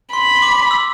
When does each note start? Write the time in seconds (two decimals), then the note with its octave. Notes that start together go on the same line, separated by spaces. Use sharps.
0.13 B5 C6
0.36 C6
0.42 D6
0.71 E6